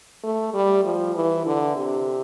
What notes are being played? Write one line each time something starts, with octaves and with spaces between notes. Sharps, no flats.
A3
G3
F3
E3
D3
C3